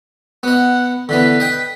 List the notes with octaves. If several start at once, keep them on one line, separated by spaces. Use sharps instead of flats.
B3 D#5 F#5
D3 E3 B3 B4
D#5 G5